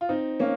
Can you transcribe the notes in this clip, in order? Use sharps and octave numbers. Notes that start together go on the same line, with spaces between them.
F4
C4 D#4
A#3 C#4